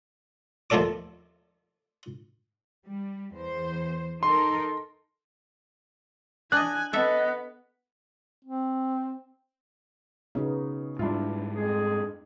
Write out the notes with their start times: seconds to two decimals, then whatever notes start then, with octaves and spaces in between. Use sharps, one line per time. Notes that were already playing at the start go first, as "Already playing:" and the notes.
0.70 D#2 F3 A3 A4 D5 D6
2.85 G3
3.34 E2 C5
4.23 D#4 A4 A#4 C6
6.52 D4 D#5 G#5 F#6
6.93 B3 A4 D#5 E5
8.45 C4
10.35 C#3 B3 D#4 F#4
10.99 G#2 G3 D4 E4 F4
11.55 F2 G#3 G#4